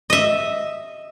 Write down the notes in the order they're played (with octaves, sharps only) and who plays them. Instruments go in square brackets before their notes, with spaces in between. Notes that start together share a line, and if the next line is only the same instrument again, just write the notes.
[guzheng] D#5 E5